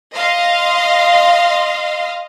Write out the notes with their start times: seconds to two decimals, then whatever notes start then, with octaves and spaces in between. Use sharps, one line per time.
0.13 D#5 F5 C6